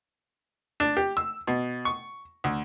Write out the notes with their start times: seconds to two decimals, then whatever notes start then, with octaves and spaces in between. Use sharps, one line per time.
0.80 D4
0.97 G4
1.17 E6
1.47 B2
1.85 C#6
2.44 D2